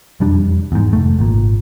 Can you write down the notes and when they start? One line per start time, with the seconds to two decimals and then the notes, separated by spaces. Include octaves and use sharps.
0.20 E1 F2 G3 D4
0.72 E2 G#2
0.93 F1 A3
1.19 G#1 A#2